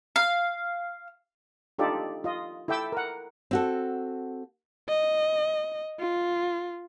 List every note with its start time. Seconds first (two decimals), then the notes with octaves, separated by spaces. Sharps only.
0.16 F5
1.78 D4 D#4 F4 G4 A4 D5
2.24 F4 D#5
2.68 E4 A4 E5 G5 D6 E6
2.92 A#4 F#5
3.51 C4 F#4 A4
4.88 D#5
5.99 F4